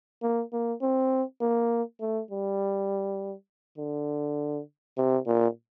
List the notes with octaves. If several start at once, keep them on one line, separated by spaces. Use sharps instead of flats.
A#3
A#3
C4
A#3
A3
G3
D3
C3
A#2